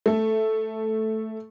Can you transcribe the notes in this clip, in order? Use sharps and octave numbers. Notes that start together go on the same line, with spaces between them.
A3 A4